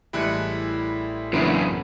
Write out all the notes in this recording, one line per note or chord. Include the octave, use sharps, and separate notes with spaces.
A1 G3 G#3 E4 F#6 C#7
F#2 C#3 E3 A#3 B3 D4 B4